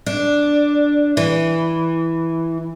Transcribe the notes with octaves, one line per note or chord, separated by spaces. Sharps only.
D4
E3